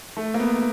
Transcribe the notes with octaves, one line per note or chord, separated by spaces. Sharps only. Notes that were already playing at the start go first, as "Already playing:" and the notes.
A3
A#3
B3